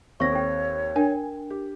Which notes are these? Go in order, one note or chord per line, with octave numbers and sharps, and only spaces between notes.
D#2 C4 C#5 C#6 A#6
A4 G5
D4 A#4 G5 G#5
G4